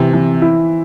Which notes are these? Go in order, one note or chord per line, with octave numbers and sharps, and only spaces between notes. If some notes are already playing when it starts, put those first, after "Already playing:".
Already playing: C3 E3 C4
E3
E4